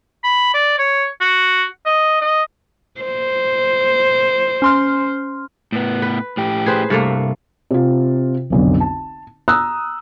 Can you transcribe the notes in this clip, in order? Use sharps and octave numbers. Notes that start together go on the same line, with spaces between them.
B5
D5
C#5
F#4
D#5
D#5
C5
C#4 C6 F6
A2 B3
B4
A2 G4
G#4 B4 C5
C2 G2 A3 A#3
C3 F4
F1 B1 D3
A5
A#5 D#6 E6 F#6